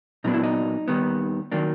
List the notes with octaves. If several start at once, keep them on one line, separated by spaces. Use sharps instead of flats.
A#2 F#3 B3 D4 D#4
E4
D#4
D#2 D#3 G3 B3
D#3 F#3 A#3 D4